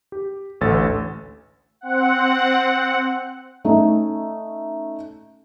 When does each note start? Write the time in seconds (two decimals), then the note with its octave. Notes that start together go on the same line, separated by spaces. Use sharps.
0.12 G4
0.61 A1 D2 D3 A4 A6
1.81 C4 F#5
3.64 A3 C#4 D#4